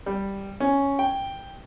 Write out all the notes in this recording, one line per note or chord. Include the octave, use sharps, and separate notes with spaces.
G3
C#4
G5